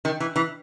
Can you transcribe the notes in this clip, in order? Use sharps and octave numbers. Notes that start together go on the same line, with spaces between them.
D#3
E3
E3